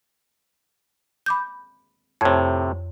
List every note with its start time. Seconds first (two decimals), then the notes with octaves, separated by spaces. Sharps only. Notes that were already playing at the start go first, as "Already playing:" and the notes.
1.26 B5 D6 G6
2.21 F2 A2 C3 C#5 G#6